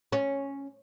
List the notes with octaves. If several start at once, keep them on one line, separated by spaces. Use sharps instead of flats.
C#4